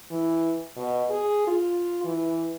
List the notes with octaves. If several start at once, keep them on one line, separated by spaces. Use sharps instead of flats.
E3
B2
G#4
F4
E3